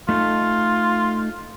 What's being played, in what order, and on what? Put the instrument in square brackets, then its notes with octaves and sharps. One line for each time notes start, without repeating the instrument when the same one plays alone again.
[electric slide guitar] A3 D#4 A4 [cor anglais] F4